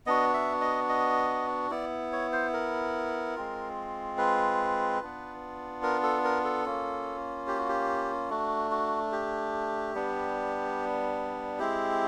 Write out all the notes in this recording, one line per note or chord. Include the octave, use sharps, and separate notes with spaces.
B3 D4 F#4 D#5
E5
D#5
D#5
B3 E4 D5
C#5
C5
A#4
G#3 C4 F4
B4
B3 D4 F4
A#4
A4
A#4
A4
A#3 C#4 F4
G4
F#4
G4
A3 D4 F#4
F#4
G4
G3 B3 D4
G#3 C4 E4 G4